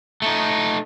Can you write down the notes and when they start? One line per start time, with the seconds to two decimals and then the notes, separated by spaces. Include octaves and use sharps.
0.22 A3 D#4